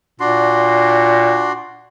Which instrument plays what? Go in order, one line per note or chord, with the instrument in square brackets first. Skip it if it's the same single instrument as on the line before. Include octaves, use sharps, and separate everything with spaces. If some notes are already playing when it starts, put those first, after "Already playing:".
[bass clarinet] A#2 [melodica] D4 F#4 C6